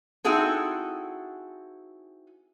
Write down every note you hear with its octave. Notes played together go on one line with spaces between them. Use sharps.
C4 D#4 E4 F#4 G#4 A4